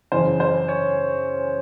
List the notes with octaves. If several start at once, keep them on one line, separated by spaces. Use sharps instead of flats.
F#2 C#3 E3 C5
C5
C#5